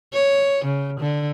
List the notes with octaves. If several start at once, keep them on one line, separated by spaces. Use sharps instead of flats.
C#5
C#3
D3